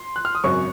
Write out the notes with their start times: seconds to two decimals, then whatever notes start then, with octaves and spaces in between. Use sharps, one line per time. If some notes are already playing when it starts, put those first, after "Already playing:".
Already playing: C6
0.16 F#6
0.25 F6
0.35 D#6
0.44 G#1 F#2 C#3 F#3 C#6